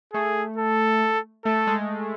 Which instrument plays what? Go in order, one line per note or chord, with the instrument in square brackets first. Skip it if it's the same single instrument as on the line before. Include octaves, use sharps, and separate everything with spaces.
[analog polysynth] A3 [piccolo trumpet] G#4
[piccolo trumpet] A4
[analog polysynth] A3 [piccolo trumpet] A4
[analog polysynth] G#3